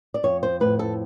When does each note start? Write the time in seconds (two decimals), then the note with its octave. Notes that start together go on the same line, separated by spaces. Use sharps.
0.14 D5
0.23 F2 C#5
0.43 C5
0.60 A2 B4
0.79 A4